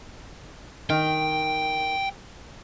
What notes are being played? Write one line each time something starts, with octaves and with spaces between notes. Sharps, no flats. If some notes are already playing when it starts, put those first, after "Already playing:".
D#3 G5